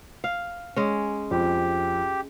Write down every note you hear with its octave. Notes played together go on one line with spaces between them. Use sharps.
F5
G#3 C#4
F2 G4